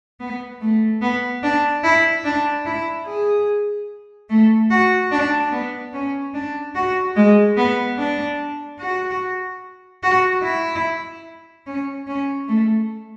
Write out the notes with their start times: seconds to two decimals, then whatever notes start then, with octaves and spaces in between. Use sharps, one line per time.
0.20 B3
0.61 A3
1.02 B3
1.43 D4
1.83 E4
2.25 D4
2.66 E4
3.06 G#4
4.29 A3
4.71 F#4
5.11 D4
5.52 B3
5.93 C#4
6.34 D4
6.75 F#4
7.16 G#3
7.57 B3
7.98 D4
8.80 F#4
10.03 F#4
10.43 E4
11.67 C#4
12.07 C#4
12.48 A3